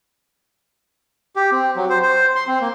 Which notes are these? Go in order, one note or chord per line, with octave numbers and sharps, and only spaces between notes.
G4
C4
F#3
C5
C5
C6
C4
A#3